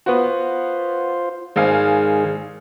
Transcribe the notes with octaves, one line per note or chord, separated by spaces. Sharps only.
B3 F4 F#4 C5
G#1 D#3 G#3 G#4 F5 G#5